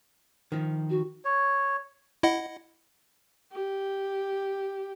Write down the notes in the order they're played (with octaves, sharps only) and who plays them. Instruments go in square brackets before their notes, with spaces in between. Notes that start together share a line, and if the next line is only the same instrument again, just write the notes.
[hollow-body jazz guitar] D#3 F3
[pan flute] F#4
[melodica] C#5
[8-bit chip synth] E4 D#5 F#5
[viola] G4